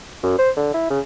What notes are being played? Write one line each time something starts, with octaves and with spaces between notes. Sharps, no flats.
F#2
C5
D3
E4
C#3